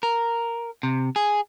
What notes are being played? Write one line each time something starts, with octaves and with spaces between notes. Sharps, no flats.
A#4
C3
G#4